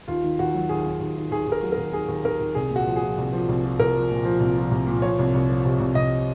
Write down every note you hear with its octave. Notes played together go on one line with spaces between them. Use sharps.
D#2 F4
D#3
D#2 F#4
F#3
D#2 G#4
D#2
D#2
D#3
D#2 G#4
D#2 A#4
F#3
A#4
D#2
D#2 G#4
D#2
D#2 A#4
D#2
C2 G#4
A#2
F#4
F3
G#4
F3
C2
F3
C2
F3
C2 A#4
F3
A#2
F3
C2
F3
C2
A#2
F3 C#5
C2
C2
F3
C3
C2
C2 D#5